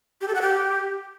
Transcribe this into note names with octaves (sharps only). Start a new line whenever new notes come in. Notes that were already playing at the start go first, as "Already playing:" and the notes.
G4
A4
F#5
G4